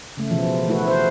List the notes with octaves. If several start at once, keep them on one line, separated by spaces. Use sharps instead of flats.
C#3 A3
B2 E3 F3
A3 E4 F#4 B4
C5